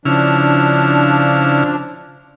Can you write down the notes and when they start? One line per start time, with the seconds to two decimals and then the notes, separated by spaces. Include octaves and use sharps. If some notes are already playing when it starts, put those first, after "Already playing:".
0.05 C#3 F3 D4 E4 F6